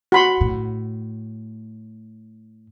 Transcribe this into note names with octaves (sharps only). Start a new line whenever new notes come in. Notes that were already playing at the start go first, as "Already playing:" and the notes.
F#4 B5 C6
A2